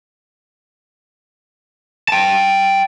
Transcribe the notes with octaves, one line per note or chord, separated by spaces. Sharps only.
G5 A5